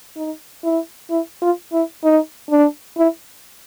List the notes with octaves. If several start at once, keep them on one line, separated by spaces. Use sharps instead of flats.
D#4
E4
E4
F4
E4
D#4
D4
E4